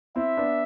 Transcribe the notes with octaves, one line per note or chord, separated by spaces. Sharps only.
C4 E4 E5
B3 D4